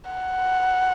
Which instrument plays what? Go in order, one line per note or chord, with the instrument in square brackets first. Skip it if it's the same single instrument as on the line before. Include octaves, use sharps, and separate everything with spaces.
[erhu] F#5